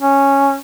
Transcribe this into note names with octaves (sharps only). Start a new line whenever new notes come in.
C#4